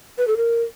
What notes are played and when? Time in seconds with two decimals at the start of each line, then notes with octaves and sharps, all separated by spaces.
0.18 B4
0.28 A4
0.37 A#4